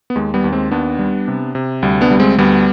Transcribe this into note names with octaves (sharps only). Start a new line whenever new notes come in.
B3
D#2 G#3
G3 B3
D#2
G#3 C4
D#2 B3 D4
G3
C3
C3
D2 G3
B3 D4
G3
G#3 C4
D2 G3 B3